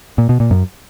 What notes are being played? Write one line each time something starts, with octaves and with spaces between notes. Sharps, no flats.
A#2
B2
A#2
F#2